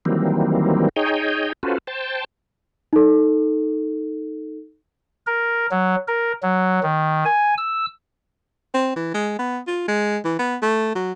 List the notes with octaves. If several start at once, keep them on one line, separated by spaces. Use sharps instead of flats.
D#3 E3 F#3 G3 A#3 C4
D#4 G#4 C#5 D#5 G5
C#4 F4 F#4 A4 B4 C5
C5 G5 A5
D#4 A4
A#4
F#3
A#4
F#3
D#3
G#5
E6
C4
E3
G#3
B3
F4
G#3
E3
B3
A3
F#3